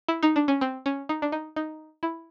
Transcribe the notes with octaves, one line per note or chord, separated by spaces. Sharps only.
E4
D#4
D4
C#4
C4
C#4
D#4
D4
D#4
D#4
E4